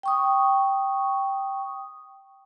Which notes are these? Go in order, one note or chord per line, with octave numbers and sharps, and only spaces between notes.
G5 C#6 D#6